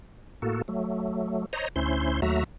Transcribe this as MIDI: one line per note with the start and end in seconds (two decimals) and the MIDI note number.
0.42 0.62 45
0.42 0.62 58
0.42 0.62 66
0.42 0.62 69
0.68 1.46 54
0.68 1.46 57
1.53 1.68 72
1.53 1.68 73
1.53 1.68 75
1.53 1.68 82
1.76 2.21 38
1.76 2.21 61
1.76 2.21 64
1.76 2.21 72
1.76 2.21 84
2.22 2.44 39
2.22 2.44 54
2.22 2.44 57
2.22 2.44 66
2.22 2.44 76
2.22 2.44 82